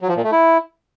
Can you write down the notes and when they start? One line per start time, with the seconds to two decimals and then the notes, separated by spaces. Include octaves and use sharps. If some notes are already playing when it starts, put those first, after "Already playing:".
0.01 F#3
0.09 F3
0.16 A#2
0.24 A3
0.32 E4